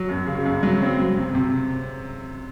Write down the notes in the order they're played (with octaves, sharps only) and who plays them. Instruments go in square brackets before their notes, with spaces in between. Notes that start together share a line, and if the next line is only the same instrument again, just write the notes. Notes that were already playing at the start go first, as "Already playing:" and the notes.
Already playing: [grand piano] F#3
F#2
C#3
F#2
F#3
C4
F#3
C3
C3